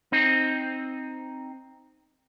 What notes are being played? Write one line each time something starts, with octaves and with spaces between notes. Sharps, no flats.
C4 D#4